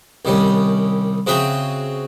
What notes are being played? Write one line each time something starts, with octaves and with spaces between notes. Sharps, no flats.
C2 D#3 G3 C#4
C#3 C4 F#4 G#4 E5 G5